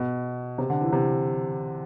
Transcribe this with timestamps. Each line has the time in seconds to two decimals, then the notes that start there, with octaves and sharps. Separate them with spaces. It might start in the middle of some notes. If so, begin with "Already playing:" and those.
Already playing: B2
0.58 C3
0.70 D3
0.81 E3
0.93 C3